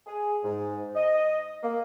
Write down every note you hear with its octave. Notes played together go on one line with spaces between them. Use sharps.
G#4
G#2
D#5
A#3